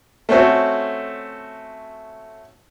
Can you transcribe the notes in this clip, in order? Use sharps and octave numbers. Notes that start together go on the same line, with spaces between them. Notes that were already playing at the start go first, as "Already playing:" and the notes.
A3 C4 C#4 F#4 A4